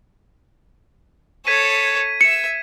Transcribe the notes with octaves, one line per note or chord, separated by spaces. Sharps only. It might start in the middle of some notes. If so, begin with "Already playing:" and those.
A4 C#5 G#6 B6 D#7
E5 E6 C#7